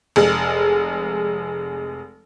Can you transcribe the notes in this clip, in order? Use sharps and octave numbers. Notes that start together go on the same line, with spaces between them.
F1 G#3